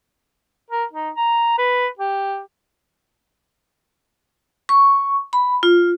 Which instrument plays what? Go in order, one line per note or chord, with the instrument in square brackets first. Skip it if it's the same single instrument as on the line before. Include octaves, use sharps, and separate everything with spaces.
[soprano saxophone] A#4
D#4
A#5
B4
G4
[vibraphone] C#6
B5
F4